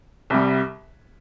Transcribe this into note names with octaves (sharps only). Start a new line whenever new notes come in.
C2 C3 G3